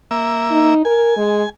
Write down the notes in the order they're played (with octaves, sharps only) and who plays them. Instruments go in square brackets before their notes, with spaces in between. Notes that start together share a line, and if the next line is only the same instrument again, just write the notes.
[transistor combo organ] A#3 E5
[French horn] D#4
[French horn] A#4 [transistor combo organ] G#5
[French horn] G#3